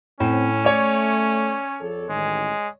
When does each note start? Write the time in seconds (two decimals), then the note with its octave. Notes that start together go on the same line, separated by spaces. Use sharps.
0.20 A2 C4 C#4
0.65 A3 C#5 D5
1.81 F2 G#4 A4
2.10 A1 D#3 G#3